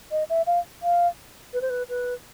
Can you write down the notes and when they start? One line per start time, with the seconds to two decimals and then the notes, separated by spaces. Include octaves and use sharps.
0.11 D#5
0.30 E5
0.47 F5
0.83 F5
1.54 B4
1.61 C5
1.70 B4
1.89 B4